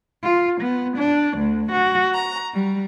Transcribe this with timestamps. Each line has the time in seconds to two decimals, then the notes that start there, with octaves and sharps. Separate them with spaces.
0.22 F4
0.61 B3
0.97 D4
1.38 D2
1.72 F#4
2.13 A#5
2.55 G3